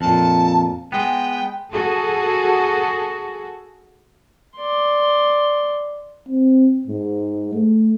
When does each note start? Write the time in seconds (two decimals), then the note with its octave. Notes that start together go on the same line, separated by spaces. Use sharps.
0.01 F2 A#2 A5
0.92 G#3 B3 G5
1.72 F#4 G#4 A4
4.56 D5 C6
6.29 C4
6.87 G#2
7.54 A3